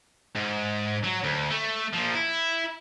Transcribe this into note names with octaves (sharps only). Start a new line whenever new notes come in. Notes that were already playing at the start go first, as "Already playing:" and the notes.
G#2
F#3
D2
A3
A#2 F3
E4